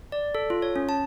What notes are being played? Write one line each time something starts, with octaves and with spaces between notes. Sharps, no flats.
D5
A4
F4
C#5
C#4
A5